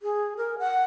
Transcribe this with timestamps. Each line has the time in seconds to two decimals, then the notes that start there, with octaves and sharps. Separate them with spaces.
0.02 G#4
0.37 A#4
0.59 F#5